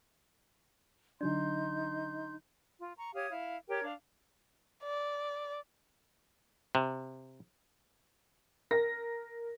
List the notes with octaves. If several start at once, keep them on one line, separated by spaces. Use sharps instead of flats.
D3 F#3 D4 D#4 C6 G6
F4
A#5 C#6
G4 C#5 F5 D#6
E4 F5
G4 A#4 C#5 G5
D4 F5
D5
C3
A#4 A#6